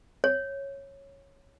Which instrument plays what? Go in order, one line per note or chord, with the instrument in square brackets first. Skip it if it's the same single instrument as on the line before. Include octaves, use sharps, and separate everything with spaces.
[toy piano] C#5